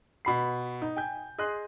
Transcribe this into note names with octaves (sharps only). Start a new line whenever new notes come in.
B2 B5 C7
D#4
G5 G#5 G6
G#4 D#5 C6 F#6